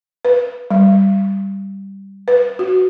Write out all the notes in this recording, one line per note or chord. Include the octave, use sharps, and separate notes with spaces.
B4
G3
B4
F#4